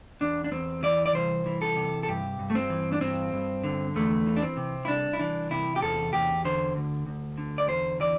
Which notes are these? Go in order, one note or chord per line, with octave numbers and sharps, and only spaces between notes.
E2 D4
D4
E2 C4
E3 D5
D5
C2 C5
E3
A4
C3
A4
G2 G4
G2
A3
C4
E3
D4
G2 C4
G2
D3
E2 A3
E3
D4
C4
C3
E4
C2 D4
E4
E3 D4
C3 E4
G4
E2 A4
E2 G4
D3 C5
D2
D2
D3
D5
E2 C5
E3 D5